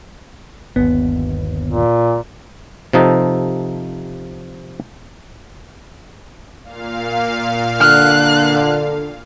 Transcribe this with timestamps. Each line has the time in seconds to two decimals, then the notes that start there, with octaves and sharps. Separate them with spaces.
0.76 G1 D#2 B3
1.66 A#2
2.93 C3 F3 D#4 A4
6.63 A#2 F5
7.81 D3 F6 F#6